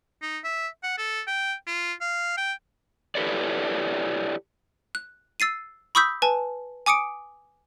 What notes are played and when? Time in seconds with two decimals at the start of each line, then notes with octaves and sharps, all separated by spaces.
0.22 D#4
0.44 E5
0.83 F#5
0.98 A4
1.27 G5
1.67 F4
2.01 F5
2.37 G5
3.15 E4 G4 A4 B4 C#5 D5
4.95 F#6
5.40 E6 A6 C7 D#7
5.95 B5 C#6 D#6 E6 G6 B6
6.22 B4 G#5 A5
6.86 G#5 D6 D#6 C#7 D7